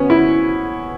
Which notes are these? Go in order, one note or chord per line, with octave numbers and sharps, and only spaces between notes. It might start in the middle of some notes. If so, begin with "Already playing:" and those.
Already playing: B3 C#4
E4